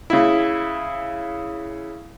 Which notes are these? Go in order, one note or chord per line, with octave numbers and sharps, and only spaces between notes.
C#3 E4